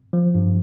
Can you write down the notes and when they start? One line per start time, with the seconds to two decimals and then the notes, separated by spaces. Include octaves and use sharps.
0.13 F3
0.35 G2